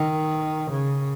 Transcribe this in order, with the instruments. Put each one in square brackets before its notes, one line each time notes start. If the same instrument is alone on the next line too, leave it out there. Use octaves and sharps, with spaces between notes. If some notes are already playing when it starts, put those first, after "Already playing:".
Already playing: [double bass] D#3
C#3